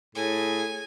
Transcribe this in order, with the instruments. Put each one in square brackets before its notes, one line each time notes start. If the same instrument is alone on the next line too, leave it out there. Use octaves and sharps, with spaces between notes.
[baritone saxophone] A2 [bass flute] G#4 [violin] G#5